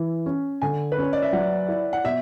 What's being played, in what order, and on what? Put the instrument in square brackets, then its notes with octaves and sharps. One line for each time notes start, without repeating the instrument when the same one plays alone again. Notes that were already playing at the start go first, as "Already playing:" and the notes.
Already playing: [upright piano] E3
C#4
[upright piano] D3 [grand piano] G#5
[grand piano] B4
[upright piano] C#4 [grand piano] C#5
[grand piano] D5
E5
[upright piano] F#3 [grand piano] F#5
[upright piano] E4
[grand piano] F#5
[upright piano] B2 [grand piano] E5